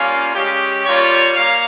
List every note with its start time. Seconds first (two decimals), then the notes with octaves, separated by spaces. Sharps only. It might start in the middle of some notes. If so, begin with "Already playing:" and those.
Already playing: G3 A#3 C#4 F4 F5
0.35 G#3 C#4 G4
0.85 G3 A#3 F4 C#5
1.36 A#3 F5